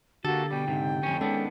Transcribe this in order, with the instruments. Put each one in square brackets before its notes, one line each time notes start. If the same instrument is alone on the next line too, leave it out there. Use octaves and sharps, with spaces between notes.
[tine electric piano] D3 G4 A6 [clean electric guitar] A#3 A4 [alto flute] F#4
[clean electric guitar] B2 G3 [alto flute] G5
[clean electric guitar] C#2 G#2 C3
F2 A2 C#4
[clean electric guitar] D#3 B3 D4 [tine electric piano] G#3 C#4 A4